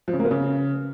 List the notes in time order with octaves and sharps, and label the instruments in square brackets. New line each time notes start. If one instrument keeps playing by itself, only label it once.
[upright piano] F3
C#3
A#3
B3
C#3